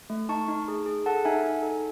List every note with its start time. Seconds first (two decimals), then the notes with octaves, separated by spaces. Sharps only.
0.10 A3
0.29 D#4 A5 C#6
0.48 D#4
0.68 G#4
0.86 G#4
1.06 A4 F#5 A5
1.25 D#4 E5 G#5
1.43 D#4
1.63 A4